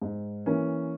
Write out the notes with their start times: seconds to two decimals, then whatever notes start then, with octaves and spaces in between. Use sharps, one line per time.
0.02 G#2
0.46 E3 A#3 C#4